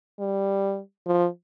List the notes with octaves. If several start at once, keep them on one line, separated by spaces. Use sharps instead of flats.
G3
F3